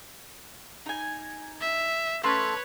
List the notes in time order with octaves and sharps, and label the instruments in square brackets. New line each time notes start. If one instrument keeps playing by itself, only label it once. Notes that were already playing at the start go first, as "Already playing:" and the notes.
[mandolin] D#4 G#5
[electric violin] E5
[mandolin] A3 C#4 C6 [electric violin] B4 C#5